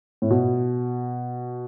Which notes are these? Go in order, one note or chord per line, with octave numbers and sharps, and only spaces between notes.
A2
B2